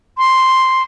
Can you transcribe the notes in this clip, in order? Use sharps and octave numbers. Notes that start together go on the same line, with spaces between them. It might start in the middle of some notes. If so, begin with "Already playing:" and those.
C6